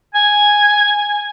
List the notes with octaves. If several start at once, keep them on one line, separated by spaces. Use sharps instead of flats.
G#5